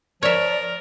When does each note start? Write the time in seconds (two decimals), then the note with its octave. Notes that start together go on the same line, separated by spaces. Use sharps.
0.23 F3 A#4 C#5 D5 E5